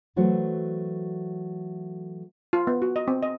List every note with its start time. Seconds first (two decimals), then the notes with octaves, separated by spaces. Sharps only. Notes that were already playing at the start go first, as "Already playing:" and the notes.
0.16 E3 F#3 A3 F#4 C5
2.53 F4
2.67 B3
2.82 F#4
2.96 D#5
3.08 C4
3.23 D#5